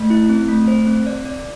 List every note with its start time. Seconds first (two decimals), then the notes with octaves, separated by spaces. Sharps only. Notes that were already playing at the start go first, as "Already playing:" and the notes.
Already playing: A3
0.10 E4
0.29 C4
0.48 A3
0.68 C5
0.87 C4
1.06 D5
1.25 D5